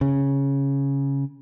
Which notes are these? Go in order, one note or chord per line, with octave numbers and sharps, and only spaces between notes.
C#3